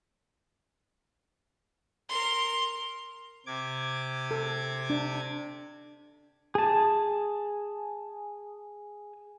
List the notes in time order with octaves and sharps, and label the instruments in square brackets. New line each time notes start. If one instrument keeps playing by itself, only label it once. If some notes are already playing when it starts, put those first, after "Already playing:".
[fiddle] A#4 C6
[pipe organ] C3 D6 G#6
[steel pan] A4
D4
[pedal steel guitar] G#4 A5